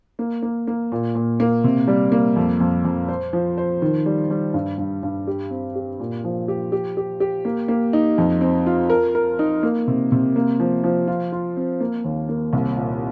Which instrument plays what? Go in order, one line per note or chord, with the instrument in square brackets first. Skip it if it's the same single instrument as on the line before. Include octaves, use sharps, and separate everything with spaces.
[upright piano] A#3
A#3
A#3
A#2
A#2
A#3
C3
G3
A#3
F2
F2
F2
C5
F3
C5
D#3
G3
G3
G2
G2
G2
G4
C4
G4
A#2
F3
G4
G4
G4
G4
A#3
A#3
D#4
F2
C4
F4
A#4
A#4
D#4
A#3
C3
C3
A#3
F3
F3
F4
F4
C4
A#3
D#2
A#3
C2
A#2